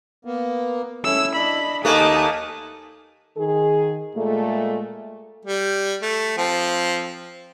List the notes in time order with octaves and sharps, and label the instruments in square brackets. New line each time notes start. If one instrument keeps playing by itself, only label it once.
[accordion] A#3 B3
[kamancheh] C#4 A4 [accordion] E4 [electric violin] E6
[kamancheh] D4 D#5 [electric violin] B5
[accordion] D#2 D#4 F#6 [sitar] A3 A#3 [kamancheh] G#5 A5 [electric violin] D#6
[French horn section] D#3 G#4
A#2 G#3 A3
[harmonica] G3
A3
F3 C4